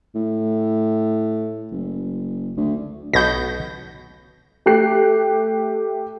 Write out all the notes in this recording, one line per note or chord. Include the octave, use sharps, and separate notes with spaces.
A2
F#1
D2
B1 B2 F#4 G6 A#6
A3 G4 F#6 C7